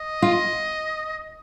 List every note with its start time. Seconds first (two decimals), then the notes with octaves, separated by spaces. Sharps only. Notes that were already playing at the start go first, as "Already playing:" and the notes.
Already playing: D#5
0.22 F4